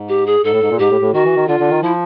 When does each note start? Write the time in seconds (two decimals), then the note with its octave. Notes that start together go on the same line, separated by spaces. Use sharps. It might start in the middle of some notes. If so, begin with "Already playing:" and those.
Already playing: G#2
0.09 G4
0.26 G#4
0.44 G#2 A4
0.52 A2
0.62 G#2
0.70 A#2
0.79 G#2 G4
0.90 A2
1.01 A2
1.13 D#3 F#4
1.25 E3
1.36 D#3
1.48 D3 F4
1.60 D3
1.70 D#3
1.82 F3 E4